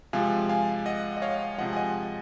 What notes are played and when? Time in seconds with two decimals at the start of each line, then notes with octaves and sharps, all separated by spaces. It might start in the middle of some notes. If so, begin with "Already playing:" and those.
0.13 C3 F3 G#3 F5 G#5
0.49 F5 G#5
0.86 D#5 F#5
1.17 D#5
1.22 C#5 F5
1.58 C3 F3 G#3 D#5 F#5
1.73 G#5
1.76 D#5 F#5